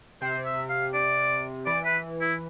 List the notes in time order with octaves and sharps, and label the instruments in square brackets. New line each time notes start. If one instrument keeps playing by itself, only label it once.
[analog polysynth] C3 [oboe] C5
[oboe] E5
F5
D5
[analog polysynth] E3 [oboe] D5
[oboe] B4
E4